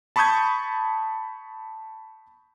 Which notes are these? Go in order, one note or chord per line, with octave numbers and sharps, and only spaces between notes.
A5 B5 C#6 D#6 G6 G#6